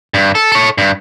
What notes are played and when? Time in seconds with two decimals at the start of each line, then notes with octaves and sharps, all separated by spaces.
0.14 G2
0.35 A4
0.52 A4 C#5
0.78 G2